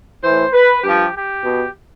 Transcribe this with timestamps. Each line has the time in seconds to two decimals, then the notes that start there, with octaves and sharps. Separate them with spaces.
0.23 A2 E3 C5
0.54 B4
0.84 G2 F3 G4
1.14 G4
1.44 B2